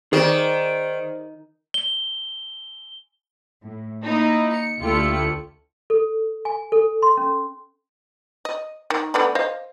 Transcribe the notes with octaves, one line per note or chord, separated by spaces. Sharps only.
D#3 G#4 C5 D5
G7
A2
A#3 D#4 E4
C#7
D2 A3 E4 F4 G4 C#7
A4
G#5
A4
C6
C#4
D#5
D#3
A3 B3 D4
C5 D#5 F5